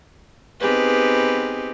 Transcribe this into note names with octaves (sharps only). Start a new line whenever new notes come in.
B3 C4 D#4 G4 G#4 B4